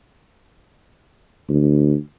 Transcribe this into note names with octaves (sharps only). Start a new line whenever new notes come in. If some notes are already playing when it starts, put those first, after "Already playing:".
D2